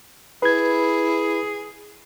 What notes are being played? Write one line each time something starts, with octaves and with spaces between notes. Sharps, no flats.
E4 G#4 B4 G#6